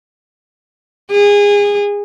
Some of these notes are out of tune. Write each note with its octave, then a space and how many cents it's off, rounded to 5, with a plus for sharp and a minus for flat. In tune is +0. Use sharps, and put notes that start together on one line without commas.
G#4 -25